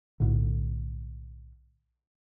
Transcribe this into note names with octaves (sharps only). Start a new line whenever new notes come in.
B1 A2 D3